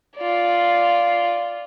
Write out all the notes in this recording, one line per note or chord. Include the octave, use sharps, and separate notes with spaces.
F4 D5